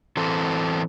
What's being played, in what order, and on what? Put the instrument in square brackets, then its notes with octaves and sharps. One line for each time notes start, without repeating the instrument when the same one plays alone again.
[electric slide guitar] E3 C4 A4